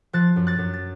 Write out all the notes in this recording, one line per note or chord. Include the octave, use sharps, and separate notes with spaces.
F3 F#6 A6
F#2
F#6 A6
F#2
A6